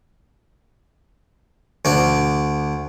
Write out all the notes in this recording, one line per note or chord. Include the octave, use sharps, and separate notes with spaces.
D2 D4